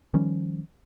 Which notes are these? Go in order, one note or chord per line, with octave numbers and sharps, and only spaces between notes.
D#3 F3 G3 C#4